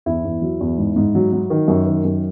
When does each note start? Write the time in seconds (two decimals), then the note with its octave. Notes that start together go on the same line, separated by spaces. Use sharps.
0.06 E2 E4
0.25 E2
0.42 F#3
0.60 E2
0.78 G#2
0.96 G#2
1.15 F#3
1.32 F#3
1.50 D#3
1.68 F#2
1.86 D#3
2.05 F#2